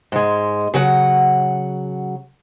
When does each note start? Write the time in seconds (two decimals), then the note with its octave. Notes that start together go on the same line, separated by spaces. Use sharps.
0.12 G#2 G#3
0.74 C#3 F#3 F#5